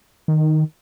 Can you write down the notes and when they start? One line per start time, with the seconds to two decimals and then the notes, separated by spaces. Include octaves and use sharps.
0.28 D#3